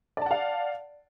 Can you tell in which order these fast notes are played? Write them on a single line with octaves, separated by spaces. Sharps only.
D5 A5 F#5 F5